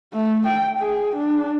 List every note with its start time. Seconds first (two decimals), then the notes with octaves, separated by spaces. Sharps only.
0.14 A3
0.47 G5
0.79 G#4
1.16 D4